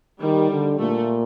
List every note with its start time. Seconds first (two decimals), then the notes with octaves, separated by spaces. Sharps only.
0.21 D#3 G3
0.51 D3
0.79 A#2 A3